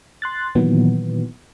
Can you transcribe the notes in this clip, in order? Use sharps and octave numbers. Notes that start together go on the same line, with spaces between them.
C6 F#6 A6
A#2 D#3 E3 F#3 B3